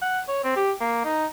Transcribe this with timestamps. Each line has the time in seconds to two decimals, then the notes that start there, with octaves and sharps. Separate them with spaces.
0.01 F#5
0.28 C#5
0.44 C4
0.56 G4
0.80 A#3
1.04 D#4